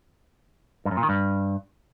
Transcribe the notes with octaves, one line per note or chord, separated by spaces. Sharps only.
G2
F#2
A#2
D#3
G2